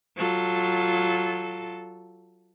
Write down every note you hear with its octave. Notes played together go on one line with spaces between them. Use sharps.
F#3 F4 A4